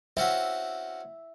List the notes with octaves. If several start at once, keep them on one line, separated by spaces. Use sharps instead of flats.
C4 C#4 F#4 E5